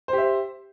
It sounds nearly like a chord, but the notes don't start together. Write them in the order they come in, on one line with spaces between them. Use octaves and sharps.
C5 G4 E5